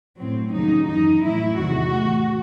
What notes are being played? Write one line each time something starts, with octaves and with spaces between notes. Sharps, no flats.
A2 F#3 C4
D#2 C#3 F#3 D#4
F#2 E3 D#4
A2 F#3 E4
E2 C3 D#3 F#4
A2 E3